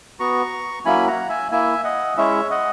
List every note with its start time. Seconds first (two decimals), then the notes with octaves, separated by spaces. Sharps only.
0.20 B3 F#4 A#5 C#6
0.85 F#3 A#3 C#4 E4 G#5 B5
1.07 F#5 A#5
1.29 E5 G#5
1.51 A#3 E4 E5 G#5
1.84 D#5 F#5
2.17 G#3 C#4 E4 C#5 E5
2.50 D#5 F#5